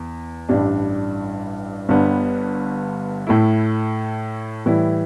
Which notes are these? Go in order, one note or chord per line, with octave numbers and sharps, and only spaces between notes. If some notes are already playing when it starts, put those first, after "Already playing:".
Already playing: E2
A1 G2 G3 D4
G1 G2 D3 G3 B3
A2 A3 E4
A2 E3 G3 E4